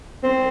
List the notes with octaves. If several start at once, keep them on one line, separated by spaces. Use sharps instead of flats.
C4